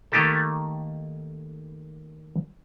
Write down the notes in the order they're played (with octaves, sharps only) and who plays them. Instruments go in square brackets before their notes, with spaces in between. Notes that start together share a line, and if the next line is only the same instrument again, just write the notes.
[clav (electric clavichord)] D#3 A3 A#3 D#4 G4 A4